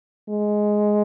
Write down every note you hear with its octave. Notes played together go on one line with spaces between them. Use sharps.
G#3